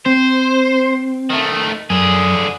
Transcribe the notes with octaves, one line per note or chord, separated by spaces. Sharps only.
C4 C5
D#3 A3
F#2 D3 G#4